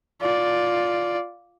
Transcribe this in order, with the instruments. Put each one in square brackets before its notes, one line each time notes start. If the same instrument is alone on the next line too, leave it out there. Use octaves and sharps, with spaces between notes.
[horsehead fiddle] F4 D5